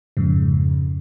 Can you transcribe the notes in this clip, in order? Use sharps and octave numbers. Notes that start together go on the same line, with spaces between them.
F2 G#2 C#3